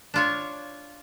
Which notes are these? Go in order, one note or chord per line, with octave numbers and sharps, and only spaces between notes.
D4 F4 C#5